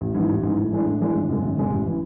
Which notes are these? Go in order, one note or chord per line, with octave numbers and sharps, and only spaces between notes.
A1
G#2 E3
A1
G#2 E3
A2
E3 G#3 D4
A2
E3 G#3 D4
G#1
F#2 C#3 G#3
G#1
F#2 C#3 G#3
A1
E3